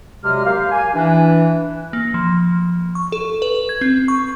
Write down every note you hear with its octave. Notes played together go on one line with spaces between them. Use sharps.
D2 C3 F#3 G#3 F6
A#3 G4 F5
G#5
E3 D4
A#3
F3
C#6
A4
B4
G#6
C4
C#6